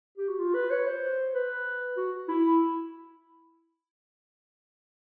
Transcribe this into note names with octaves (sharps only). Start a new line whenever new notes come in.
G4
F#4
F4
B4
C#5
C5
B4
F#4
E4